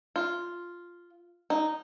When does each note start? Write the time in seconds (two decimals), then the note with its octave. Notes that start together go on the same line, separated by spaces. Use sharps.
0.16 F4
1.50 D#4